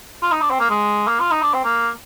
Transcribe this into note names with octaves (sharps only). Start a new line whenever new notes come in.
F4
D#4
D4
C4
A#3
G#3
A#3
F4
D#4
D4
C4
A#3